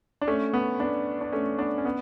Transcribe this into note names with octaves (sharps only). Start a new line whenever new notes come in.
D4
A3 C#4
B3
B3 D4
D4
A3 C#4
B3 D4
C#4
B3